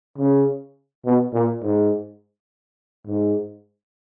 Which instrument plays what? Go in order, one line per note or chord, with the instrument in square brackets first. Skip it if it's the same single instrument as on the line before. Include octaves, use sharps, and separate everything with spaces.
[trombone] C#3
B2
A#2
G#2
G#2